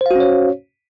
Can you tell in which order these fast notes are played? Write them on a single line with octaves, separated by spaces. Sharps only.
C5 F5 F#4 C#4 C#5